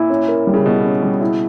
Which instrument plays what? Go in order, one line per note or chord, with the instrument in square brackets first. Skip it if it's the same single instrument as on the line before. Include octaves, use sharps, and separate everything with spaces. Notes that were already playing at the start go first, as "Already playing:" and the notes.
Already playing: [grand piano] A#2 [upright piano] E4
[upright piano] C#4
A#4
G3
[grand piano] C#3
[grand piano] B2 [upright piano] E4
[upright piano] C#4
G3
E4